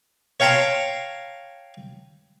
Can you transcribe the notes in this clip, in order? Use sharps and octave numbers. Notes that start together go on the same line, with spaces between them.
C#5 F5 G5 A5 A#5 C6